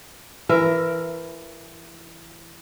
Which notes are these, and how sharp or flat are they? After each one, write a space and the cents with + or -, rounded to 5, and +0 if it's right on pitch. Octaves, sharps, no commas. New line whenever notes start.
E3 +15 A#4 +5 E5 +30